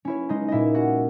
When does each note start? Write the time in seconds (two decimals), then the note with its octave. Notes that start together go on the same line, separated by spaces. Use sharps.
0.05 C#4 E4 C#5
0.29 G#3 D#4 D#5
0.48 A#2 E4 D#5 E5
0.74 C#4 F#4 F#5